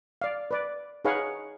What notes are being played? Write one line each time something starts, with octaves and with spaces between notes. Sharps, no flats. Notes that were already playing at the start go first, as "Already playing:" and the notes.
D5 F5
B4 D5
D#4 G#4 B4 C#5 F5 F#5